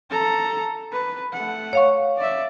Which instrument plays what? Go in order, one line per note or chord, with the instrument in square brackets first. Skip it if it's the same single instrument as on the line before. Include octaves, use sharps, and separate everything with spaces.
[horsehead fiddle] A4 A#5
B4
A3 F#5
[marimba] C#5 F5 C#6
[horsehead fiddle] D5 E5